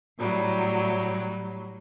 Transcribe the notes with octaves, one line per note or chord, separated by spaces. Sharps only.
A2 F#3 G3